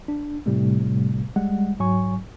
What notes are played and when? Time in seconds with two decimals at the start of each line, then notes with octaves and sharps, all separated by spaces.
0.08 D4
0.46 A2 C3 G3 A3
1.36 G3 G#3 F#5
1.79 G#2 F#3 G#5 C#6